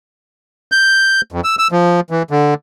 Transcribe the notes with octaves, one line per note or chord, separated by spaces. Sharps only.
G6
F2
E6
E6
F3
E3
D3